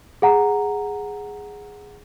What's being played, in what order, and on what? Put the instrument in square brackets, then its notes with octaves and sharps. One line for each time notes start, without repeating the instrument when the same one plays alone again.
[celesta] G#4 F#5 A#5